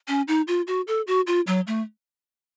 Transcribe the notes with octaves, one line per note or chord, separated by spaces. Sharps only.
C#4
D#4
F4
F#4
A4
F#4
F4
F#3
A3